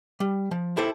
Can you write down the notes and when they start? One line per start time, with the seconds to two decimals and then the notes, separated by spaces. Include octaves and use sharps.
0.20 G3
0.51 F3
0.77 E4 G4 A4 C5